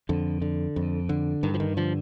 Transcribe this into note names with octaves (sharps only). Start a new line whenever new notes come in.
F2 D3
D3
F2
D3
G2 D#3
F3
D#3
D3 F3